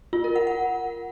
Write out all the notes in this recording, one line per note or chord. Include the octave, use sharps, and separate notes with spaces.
F4
A#4
F#5
F#5